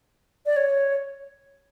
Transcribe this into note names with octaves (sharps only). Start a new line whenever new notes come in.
D5
C#5